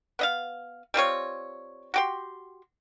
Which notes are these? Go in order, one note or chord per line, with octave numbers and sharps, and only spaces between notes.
B3 D#5 F5
G3 C4 F4 C#5
F#4 G4 C6